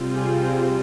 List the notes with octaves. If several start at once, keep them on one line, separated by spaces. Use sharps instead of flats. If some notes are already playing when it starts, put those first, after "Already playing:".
Already playing: C3 G3 C4 F4
G#4
G#4